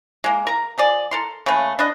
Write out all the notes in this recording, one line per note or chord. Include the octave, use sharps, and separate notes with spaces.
G#3 A#3
A#4 A#5
F3 G#4 D5
A4 A#4 C6
C#3 A3 A#3 B4
D4 B4 D#5